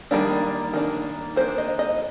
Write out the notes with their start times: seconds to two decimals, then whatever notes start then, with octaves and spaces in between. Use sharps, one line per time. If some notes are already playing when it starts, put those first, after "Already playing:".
0.11 D#3 G3 A#3 D4
0.74 D#3 A#3 D4
1.36 D#3 A#3 D4 C5
1.58 D#5
1.79 D#5